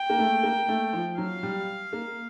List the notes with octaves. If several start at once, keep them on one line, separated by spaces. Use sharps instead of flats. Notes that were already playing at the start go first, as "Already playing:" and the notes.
Already playing: G5
A#3
A3
A#3
A3
F3
F#3 F5
G3
A#3